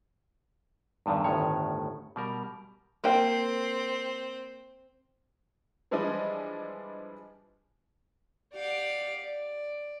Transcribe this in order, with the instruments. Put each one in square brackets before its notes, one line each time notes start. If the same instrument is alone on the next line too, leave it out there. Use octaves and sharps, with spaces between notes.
[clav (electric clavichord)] E2 G2 D3 D#3
G1 D2 A2 D#3 C#5
B2 G3 A#4
[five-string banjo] A#3 G5 [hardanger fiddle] C4
[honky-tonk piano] E3 F3 G3 G#3 D4 D#5
[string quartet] G4 D5 F5 F#5
D5